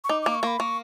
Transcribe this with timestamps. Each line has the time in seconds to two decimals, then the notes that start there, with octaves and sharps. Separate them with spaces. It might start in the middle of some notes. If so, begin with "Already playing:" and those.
0.04 C#6
0.09 D#4 D6
0.22 A#3 D6
0.35 C#6
0.43 A#3 B5
0.60 A#3 C#6